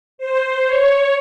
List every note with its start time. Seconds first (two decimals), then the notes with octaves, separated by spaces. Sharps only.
0.18 C5
0.66 C#5